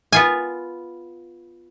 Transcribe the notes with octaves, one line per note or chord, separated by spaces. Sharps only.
B3 F4 G#5